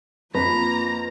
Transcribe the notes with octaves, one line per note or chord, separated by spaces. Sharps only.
F2 A#3 F4 B4 A#5